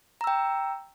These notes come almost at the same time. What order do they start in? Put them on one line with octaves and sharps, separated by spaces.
A#5 E6 G5